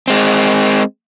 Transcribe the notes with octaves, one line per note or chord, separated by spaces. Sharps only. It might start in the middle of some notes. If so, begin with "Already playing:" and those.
G#3 C4